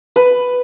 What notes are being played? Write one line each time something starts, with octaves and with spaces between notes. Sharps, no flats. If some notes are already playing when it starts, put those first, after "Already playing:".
B4